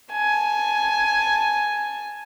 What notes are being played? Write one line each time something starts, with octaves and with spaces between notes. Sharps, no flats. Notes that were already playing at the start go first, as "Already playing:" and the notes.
G#5 A5